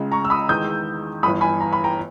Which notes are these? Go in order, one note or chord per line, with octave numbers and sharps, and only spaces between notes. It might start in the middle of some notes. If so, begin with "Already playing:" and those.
Already playing: C#2 C#3 G#3
A#5 C#6
E6
B5 D#6
E2 D#3 G#3 D#6 G6
G1 G2 E3 B5 D#6
G#5 B5
A#5
B5
G5 A#5